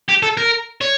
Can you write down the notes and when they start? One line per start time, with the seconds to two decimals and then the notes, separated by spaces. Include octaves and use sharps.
0.09 G4
0.22 A4
0.37 A#4
0.81 C#5